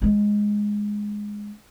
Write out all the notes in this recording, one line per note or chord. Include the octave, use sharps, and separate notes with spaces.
G#3 C#4